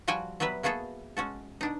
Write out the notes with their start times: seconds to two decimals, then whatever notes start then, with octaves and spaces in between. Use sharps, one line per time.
0.08 F3 G3 F#4 G5 G#5
0.40 F#3 G3 B3 B4 E5
0.63 A#3 B3 F#4 G#4 A4
1.17 G#3 C#4 F#4 A4
1.61 B2 D4 D#4